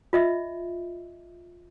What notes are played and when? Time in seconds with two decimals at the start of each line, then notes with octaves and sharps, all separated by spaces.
0.13 F4 D#5 E5